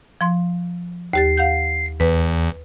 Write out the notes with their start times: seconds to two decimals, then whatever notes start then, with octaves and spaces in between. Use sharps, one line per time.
0.21 F3 C6
1.13 D#2 G4 A6 C7
1.37 F5 F#5 G6
2.00 E2 B4